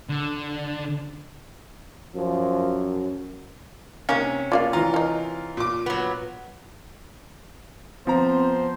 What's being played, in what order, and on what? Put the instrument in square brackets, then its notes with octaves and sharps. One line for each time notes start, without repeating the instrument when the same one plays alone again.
[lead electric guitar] D3
[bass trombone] F#2 [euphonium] F3
[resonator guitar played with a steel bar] C3 C#4 [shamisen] A#3 D#4 A#4
[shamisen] C#3 A#3 F5 [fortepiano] F4 D5
[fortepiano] E3 A#5 [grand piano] F4
[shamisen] D#3 D#4
[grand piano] A#2 D6
[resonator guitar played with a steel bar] F#3 B3
[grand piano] F3 A#5 [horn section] B3 C5 [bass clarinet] C4